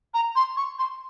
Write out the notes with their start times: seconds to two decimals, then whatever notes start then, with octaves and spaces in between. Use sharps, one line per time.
0.13 A#5
0.35 C6
0.56 C#6
0.78 C6